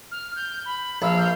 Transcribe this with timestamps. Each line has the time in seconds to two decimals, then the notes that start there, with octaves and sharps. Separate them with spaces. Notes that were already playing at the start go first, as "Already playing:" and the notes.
0.11 F6
0.36 G6
0.65 B5
1.02 A#1 F5 E6
1.18 G6